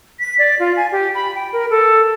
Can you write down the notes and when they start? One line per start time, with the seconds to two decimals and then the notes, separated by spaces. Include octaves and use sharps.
0.20 B6
0.39 D5
0.59 F4
0.76 G#5
0.92 G4
1.15 B5
1.35 G5
1.53 A#4
1.70 A4